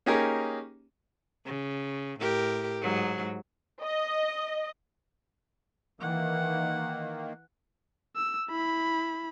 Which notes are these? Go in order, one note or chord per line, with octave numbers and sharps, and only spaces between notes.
A#3 C#4 D#4 G4 G#4 A#4
C#3
A2 G4 A#4
G#2 F#3
D#5
D#3 E3 A#3 F#5
E6
E4 B5